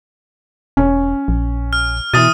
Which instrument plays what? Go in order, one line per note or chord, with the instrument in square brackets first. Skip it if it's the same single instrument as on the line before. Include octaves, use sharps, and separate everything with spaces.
[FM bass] E1 [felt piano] C#4
[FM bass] A#1
[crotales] F6
[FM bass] B2 [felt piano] E3 A6 [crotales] D#6 D#7